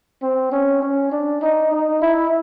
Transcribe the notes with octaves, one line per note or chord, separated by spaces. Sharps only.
C4
C#4
C#4
D4
D#4
D#4
E4